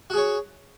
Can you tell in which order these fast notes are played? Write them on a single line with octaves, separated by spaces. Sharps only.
F#4 G#4 C#5